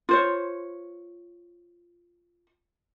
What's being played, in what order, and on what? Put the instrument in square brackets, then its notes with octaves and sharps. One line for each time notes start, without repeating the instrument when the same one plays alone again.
[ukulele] F4 C5 C#5